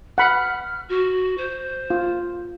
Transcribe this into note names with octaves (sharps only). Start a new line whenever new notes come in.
F#5 B5 F6
F#4
C5
F4